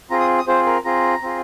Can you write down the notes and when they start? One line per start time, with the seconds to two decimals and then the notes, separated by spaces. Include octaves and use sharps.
0.10 C4 F4 G#4 A#5
0.20 D#6
0.38 D#6
0.47 C4 F4 G#4 C5
0.66 A#4
0.84 C4 F4 G#4 A#5
1.23 C4 F4 G#4